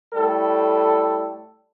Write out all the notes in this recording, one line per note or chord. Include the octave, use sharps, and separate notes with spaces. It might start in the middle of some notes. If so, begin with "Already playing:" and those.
A2 G3 A4